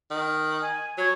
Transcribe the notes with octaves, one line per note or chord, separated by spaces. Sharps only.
D#3
G#5
F#3 C#5